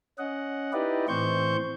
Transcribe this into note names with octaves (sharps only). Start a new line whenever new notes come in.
C#4 D#5 F#5
D#4 E4 G4 B4 D5 D#5
A2 E3 C4 C5 C#6 G6